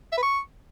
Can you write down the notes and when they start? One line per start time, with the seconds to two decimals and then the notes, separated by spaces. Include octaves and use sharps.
0.12 E5
0.17 B4
0.23 C#6